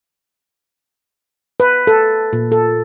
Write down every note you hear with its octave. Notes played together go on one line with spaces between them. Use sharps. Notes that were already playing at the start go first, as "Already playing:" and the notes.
B4
A4
A#2
A4